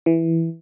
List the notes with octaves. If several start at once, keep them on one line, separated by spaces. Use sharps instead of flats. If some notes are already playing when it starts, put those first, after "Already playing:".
E3